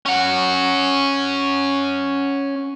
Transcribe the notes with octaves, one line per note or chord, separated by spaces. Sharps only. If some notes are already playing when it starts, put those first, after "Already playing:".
C#4 F#5